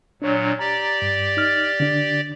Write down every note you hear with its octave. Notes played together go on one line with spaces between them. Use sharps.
A#2 F#3 D4 C#5
G4 D5 A#5
G2
D#4 F6 A6
D3 D4